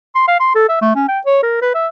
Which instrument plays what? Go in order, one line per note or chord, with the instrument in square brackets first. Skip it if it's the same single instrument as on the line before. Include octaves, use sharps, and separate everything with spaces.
[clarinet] C6
F5
C6
A4
E5
A3
C#4
G5
C#5
A#4
B4
E5